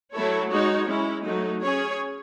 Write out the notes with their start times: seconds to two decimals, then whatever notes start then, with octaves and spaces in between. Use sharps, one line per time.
0.13 F#3 A3 E4 A4 C#5
0.50 G#3 D#4 F#4 C#5
0.87 G#3 C#4 E4
1.24 F#3 A3 D#4
1.62 C#4 G#4 C#5